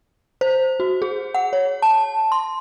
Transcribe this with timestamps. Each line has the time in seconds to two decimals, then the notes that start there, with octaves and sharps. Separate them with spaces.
0.41 C5
0.80 F#4
1.02 G#4
1.34 F#5
1.53 C#5
1.82 A5
2.32 C6